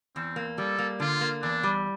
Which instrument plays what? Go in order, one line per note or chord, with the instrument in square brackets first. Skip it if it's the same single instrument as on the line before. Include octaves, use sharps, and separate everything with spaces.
[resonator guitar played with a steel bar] E2 [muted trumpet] C4
[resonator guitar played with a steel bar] A#3
[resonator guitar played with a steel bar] G3 [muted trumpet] A4
[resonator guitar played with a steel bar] A#3
[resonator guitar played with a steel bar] D3 [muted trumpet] F4
[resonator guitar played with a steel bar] A#3
[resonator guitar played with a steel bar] E2 [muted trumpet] D4
[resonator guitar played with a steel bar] G3